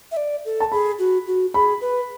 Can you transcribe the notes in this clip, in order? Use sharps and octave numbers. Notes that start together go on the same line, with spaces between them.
E5
D5
A4
A5
G#4 B5
F#4
F#4
G#4 B5
B4